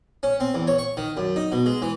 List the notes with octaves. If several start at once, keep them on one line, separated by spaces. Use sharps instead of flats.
C#4
C4
E2
C#5
C#6
D#3
F#2
D#4
B2
G#3
E3